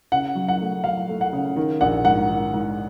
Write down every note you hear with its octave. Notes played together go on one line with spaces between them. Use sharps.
C#3 F#5
F#3
F#5
A3
F#3 F5
A3
F#5
C#3
D#3
A#1 F#5
G#2 F#5
D#3
G#2